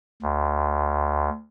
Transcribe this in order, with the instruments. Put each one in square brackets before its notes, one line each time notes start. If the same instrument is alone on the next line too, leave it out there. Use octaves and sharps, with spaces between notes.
[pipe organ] D2